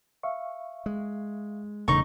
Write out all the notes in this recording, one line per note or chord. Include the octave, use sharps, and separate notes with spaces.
E5 F5 C#6
G#3
E1 E2 A#2 C#3 A3 D#4 C#6